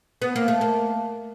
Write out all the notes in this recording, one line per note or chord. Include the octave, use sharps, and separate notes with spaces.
B3
A#3
A3
A#3